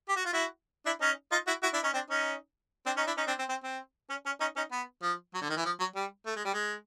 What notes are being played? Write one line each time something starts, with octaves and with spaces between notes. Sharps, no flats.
G4
F#4
F4
E4 F#4
D4 E4
C#4 D#4
D#4 F4
E4 F#4
E4 F#4
D4 E4
C#4 D#4
C4 D4
C#4 D#4
C4 D4
C#4 D#4
D4 E4
C#4 D#4
C4 D4
C4
C4
C4
C#4
C#4
C#4 D#4
C#4 D#4
B3
F3
F#3
D3
D#3
E3
F3
F#3
G3
A3
G#3
G3
G#3